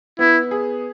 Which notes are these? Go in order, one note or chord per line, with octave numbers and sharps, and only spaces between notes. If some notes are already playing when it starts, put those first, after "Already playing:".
B3 E4
G#4